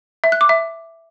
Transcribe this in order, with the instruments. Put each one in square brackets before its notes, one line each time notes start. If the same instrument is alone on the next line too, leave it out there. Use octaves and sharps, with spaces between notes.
[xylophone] E5
F#6
D6
E5